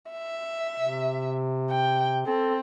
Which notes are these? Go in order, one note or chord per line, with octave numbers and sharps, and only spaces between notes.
E5
C3
G5
C4 A4